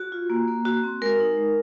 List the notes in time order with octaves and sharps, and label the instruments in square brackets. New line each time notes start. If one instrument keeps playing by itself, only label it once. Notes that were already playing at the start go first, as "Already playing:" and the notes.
Already playing: [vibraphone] F#4
F4
A#3
A#3
F#4
C4
G#3 A#4
D#4
G#3